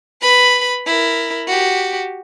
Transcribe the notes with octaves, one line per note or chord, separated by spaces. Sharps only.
B4 B5
E4 A#4
F#4 G4